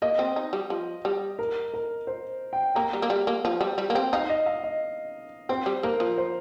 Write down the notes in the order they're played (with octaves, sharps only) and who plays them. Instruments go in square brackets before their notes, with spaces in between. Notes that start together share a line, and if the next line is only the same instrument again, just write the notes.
[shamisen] A#3 [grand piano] D#5
[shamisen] C4
D#4
G3
F3
G3
[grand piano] A#4
A#4
C5
G5
[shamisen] A#3 [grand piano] A#5
[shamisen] G3
A#3
G3
A#3
F3
G3
G3
A#3
C4
[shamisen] D#4 [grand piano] F5
[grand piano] D#5
F5
D#5
[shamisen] C4 [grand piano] C5
[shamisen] G3
[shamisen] A#3 [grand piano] A#4
[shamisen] F3
[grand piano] C5